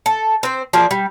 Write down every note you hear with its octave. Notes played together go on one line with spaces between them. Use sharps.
A4
C4 C5
F3 A#3 G#4 D5
G3